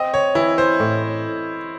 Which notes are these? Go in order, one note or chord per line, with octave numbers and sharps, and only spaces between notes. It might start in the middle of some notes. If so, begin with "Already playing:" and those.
Already playing: C4 D#5
C#5
E3 E4
C5
A2